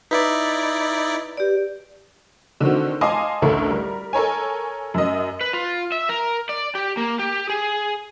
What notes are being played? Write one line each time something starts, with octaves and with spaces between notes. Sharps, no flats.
D#4 E4 B4 D5
G4 D5
D3 D#3 C4 F#4
D#5 F5 G#5 A5 C6 D6
A1 D2 D3 A3 A4 A#4
G3 A#4
A4 A#4 C#5 G#5
F#2 D#5
B4
F4
E5
A#4
D5
G4
A#3
G4
G#4